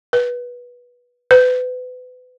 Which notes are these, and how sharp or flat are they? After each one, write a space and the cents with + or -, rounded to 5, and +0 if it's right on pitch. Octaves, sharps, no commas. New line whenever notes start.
B4 -20
B4 +30